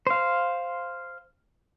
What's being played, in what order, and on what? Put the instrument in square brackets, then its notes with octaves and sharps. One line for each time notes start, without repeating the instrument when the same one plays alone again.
[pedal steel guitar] C5 F5